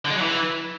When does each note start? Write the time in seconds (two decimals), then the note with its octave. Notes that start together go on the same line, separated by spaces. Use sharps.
0.05 D3
0.10 G#3
0.16 F#3
0.21 E3